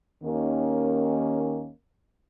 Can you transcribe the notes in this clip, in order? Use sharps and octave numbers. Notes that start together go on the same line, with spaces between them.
D#2 D#3 A#3 C#4